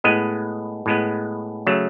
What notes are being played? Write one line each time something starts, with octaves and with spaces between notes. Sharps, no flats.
A2 G#3 B3 D#5
A2 G#3 B3
C#3 F#3 A3